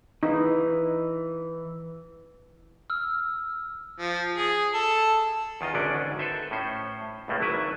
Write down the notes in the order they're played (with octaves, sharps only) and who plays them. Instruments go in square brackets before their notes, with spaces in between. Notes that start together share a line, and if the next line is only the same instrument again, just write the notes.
[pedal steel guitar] E3 [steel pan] D#4
[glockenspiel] E6 F6
[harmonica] F3
G#4
A4
[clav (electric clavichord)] E2 D#3 F4 D#5
G#1 G#2 D3 C#4 D4 D5
A4 B4 C5 E5
A2 C#4 C5
C#2 A2 A3 A#3
G#1 F#3 E4 B4 E5